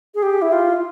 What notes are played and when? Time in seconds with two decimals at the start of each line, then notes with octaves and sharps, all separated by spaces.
0.15 G#4
0.23 G4
0.42 E4
0.52 F4